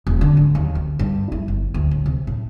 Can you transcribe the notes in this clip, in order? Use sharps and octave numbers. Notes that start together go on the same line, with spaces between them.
E1
D3
G#2
D#2
D2
G2
E4
G1
D2
A2
C3
A2